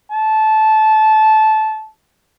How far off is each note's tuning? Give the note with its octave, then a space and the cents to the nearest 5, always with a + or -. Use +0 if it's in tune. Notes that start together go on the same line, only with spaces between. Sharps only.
A5 -15